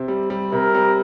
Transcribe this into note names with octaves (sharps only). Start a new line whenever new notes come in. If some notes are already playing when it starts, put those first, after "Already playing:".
Already playing: C3 C4
G3
G3
C3 A#4
G3